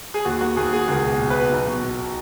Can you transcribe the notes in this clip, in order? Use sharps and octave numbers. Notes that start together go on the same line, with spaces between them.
G#4
D#2 F#4
A#3 F#4
D#2 G#4
A#3 G#4
C#2 G#4
B2
B2
B4
B2
B1
B2
B2